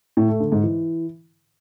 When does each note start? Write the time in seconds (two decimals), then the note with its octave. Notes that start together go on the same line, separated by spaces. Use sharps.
0.17 A2
0.29 A3
0.40 D3
0.52 G#2
0.64 E3